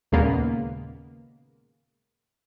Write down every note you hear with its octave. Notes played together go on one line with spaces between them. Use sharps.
D#2 A#2 C#3 G#3 A#3 B3